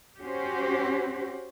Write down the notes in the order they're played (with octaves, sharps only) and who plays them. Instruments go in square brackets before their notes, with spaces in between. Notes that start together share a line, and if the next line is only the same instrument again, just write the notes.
[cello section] C#4 F#4 G4 C5